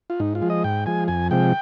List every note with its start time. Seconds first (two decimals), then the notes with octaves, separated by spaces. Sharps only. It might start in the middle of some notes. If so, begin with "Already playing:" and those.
0.10 F4
0.20 G#2 D#4
0.35 F4
0.42 F3 G#3
0.50 D#5
0.64 G#2 G5
0.86 F3 G#3 G#5
1.08 F2 G#5
1.31 C3 F3 G#3 G5